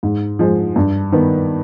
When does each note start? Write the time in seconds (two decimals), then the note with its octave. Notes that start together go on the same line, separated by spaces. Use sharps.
0.03 G#2
0.39 F3 G#3
0.76 G2
1.12 D#3 B3